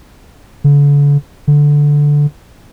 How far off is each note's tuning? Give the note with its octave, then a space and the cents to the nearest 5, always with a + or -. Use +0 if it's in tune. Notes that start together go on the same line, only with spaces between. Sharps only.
D3 -40
D3 -5